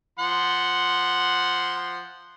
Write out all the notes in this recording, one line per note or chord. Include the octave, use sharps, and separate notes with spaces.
F3 F#5 C6